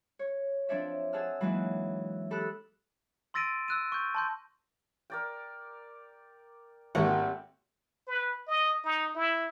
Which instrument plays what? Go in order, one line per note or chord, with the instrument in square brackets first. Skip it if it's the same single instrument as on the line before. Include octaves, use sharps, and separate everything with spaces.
[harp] C#5
F3 C4 D4 C#5 D5 E5
G#4 F#5 A5 E6 F6
E3 F#3 G#3 A#3 D#4 E4
G4 A4 B5 D#6 E6 F#6
[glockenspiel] C6 E6 A6 A#6 D7 D#7
E6 F#6 D#7
C#6 G6
A5 C6 G6
[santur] A#4 D5 G5
[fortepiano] G#1 A#3 G4 [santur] G3 A3 C4 [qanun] F#5
[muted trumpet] B4
D#5
D#4
E4